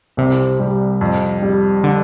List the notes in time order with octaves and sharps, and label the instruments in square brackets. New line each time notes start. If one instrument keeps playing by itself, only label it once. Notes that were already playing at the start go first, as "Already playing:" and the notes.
[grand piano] C2 [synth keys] C3
[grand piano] G3
F2
G3
[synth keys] D3